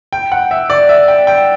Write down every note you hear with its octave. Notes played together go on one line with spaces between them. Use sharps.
G5
F#5
E5
D5
E5
G5
G5